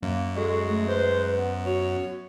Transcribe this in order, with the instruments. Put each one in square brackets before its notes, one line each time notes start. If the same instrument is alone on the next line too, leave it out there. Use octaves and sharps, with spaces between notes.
[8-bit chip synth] F#2 [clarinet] A#3
[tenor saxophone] G#3 [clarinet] F#4 [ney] A4
[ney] A3
[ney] B4 [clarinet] C5
[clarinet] B3
[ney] F#4 [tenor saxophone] C#5